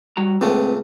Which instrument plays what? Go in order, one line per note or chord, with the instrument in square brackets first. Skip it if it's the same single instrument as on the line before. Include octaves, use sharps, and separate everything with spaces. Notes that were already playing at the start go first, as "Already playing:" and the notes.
[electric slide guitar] G3 F#4 A#5
[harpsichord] C#2 A#2 A3 [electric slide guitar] C4 B4 C5